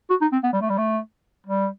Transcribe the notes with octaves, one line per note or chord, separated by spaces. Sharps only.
F#4
D#4
C4
B3
G3
A3
G3
A3
G3